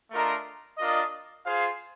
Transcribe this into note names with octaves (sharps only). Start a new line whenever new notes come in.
A3 D4 F4 A#4 D#5
D4 F4 A#4 D#5
F4 G#4 C5 F5